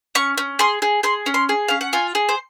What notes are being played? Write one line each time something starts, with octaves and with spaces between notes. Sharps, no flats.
C#4 C#6
C#4
G#4 C6
G#4
G#4 C6
C#4
C6
G#4
C#4 F5
F#5
F4 G#5
G#4
C5